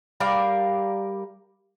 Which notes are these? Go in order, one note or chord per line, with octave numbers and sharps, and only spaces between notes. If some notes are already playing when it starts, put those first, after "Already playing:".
G3 A#4 D5 F5